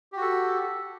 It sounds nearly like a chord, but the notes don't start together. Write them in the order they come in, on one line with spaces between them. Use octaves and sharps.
G4 F#4 A4